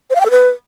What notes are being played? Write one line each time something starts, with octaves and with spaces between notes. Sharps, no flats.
C5
F5
G5
A4
B4